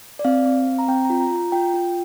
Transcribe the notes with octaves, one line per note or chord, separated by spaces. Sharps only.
D5
C4 F5
C4
C4
A#5
C4 G5
F4 A#5
A#5
F4 A#5
F4 G5
F4